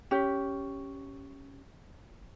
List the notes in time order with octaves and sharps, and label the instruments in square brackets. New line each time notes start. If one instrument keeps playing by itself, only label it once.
[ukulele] C#4 G4